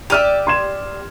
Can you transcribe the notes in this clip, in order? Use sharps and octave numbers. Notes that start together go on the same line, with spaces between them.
G4 D5 E5 F6 D#7 F7
C6 G#6 E7